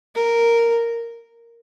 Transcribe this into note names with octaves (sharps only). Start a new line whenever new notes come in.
A#4